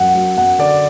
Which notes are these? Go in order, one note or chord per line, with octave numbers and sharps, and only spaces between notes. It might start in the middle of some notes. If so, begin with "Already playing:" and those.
Already playing: F#2 F#3 F#5
F#3
F#2 F#5
D3 D5